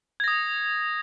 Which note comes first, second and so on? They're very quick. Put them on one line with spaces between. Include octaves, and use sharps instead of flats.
G#6 A#6 D#6